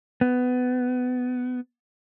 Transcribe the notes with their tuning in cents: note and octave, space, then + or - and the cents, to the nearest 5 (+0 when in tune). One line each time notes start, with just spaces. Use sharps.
B3 +20